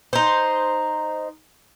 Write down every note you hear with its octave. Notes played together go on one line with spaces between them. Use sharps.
D#4 C5